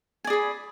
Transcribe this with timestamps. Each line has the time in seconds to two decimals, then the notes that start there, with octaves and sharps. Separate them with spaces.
0.25 G#5
0.27 D5
0.30 G#4
0.33 B5